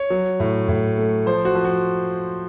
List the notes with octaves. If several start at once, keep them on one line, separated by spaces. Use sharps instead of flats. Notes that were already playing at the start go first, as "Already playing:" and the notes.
Already playing: C#5
F#3
A2
A2
A3
F3 C5
F#4
F3
F#4